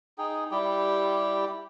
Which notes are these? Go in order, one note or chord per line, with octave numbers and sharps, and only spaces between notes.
D#4 G#4 G5
G3 E4 G4 G5